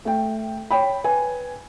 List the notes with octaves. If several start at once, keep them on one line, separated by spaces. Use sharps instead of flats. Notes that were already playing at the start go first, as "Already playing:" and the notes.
A3 G5
C#5 G5 B5
B4 G#5